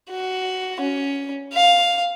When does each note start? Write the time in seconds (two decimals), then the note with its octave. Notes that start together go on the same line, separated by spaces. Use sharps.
0.10 F#4
0.80 C#4
1.53 F5